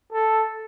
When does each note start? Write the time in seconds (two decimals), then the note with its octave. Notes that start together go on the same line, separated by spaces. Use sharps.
0.12 A4